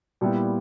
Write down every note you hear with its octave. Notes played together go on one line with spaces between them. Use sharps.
A#2 G3 B3 E4 G4